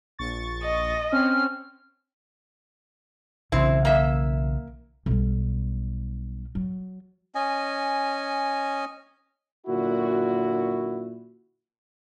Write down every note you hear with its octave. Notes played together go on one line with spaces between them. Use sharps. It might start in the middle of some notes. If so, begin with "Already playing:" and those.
A#1 C#6 A6
D#5
C4 C#4 F6
B1 C#3 E3 C4 E4
A#3 E5
B1 G3
F#3
C#4 D#5 G#5
F#2 A#2 D3 E4 F#4